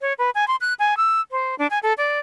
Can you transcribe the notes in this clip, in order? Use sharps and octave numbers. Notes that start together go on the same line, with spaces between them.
C#5
B4
G#5
C6
F#6
G#5
E6
C5
D4
G#5
A4
D5